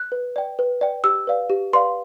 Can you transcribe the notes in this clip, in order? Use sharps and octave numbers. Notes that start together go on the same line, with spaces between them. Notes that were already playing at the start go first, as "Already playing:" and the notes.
Already playing: F#6
B4
D5 G5
B4
D5 G5
G4 E6
B4 D5 F5
G4
B4 D5 F5 C6